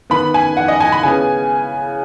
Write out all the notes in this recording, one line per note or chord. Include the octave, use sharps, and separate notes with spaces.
D#3 B3 B5
G#5
F#5
D#5
G#5
B5
C#3 B3 G#5